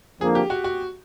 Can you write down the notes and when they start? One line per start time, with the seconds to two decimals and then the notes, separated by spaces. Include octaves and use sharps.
0.21 F2 D3 F3 A#3 G#4
0.35 G4
0.50 F#4
0.64 F#4